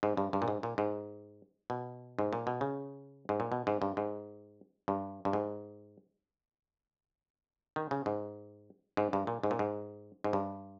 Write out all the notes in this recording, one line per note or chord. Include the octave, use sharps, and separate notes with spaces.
G#2
G2
G2
A#2
G#2
A#2
G#2
B2
G#2
A#2
B2
C#3
G#2
A#2
B2
G#2
G2
G#2
G2
G2
G#2
D#3
C#3
G#2
G#2
G2
A#2
G#2
A#2
G#2
G#2
G2